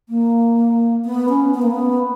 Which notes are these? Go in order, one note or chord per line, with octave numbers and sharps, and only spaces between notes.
A#3
B3
C#4
B3
A#3
B3